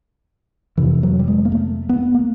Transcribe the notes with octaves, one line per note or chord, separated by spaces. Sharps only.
F2 C3 E3
F#3
G3
G#3
A#3
A3
B3
A#3